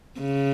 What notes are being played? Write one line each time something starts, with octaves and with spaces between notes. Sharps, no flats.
C#3